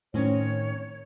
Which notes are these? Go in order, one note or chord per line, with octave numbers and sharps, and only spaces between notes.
A2 D#3 C4 C#4 C#5